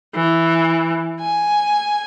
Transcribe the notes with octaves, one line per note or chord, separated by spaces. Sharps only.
E3
G#5